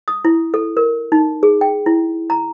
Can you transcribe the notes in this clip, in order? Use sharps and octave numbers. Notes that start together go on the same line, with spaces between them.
D#6
E4
A4
A#4
D#4
G#4
G5
E4
A#5